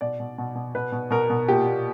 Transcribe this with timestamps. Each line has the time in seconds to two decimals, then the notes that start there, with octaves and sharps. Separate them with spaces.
0.01 B2 D5
0.20 B2
0.38 B2
0.55 B2
0.75 B2 B4
0.92 B2
1.10 B2 A#4
1.30 B2
1.48 A#2 G4
1.66 A#2